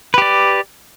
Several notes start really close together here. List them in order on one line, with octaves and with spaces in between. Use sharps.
B4 G4 D5